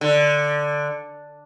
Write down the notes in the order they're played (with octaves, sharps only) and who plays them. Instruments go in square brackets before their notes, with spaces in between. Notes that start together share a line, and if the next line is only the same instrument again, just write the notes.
[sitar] D3